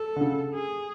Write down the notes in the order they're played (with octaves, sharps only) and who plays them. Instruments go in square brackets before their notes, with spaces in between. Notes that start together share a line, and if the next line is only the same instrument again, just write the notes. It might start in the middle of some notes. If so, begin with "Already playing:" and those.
Already playing: [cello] A4
[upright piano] D3
C#3
[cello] G#4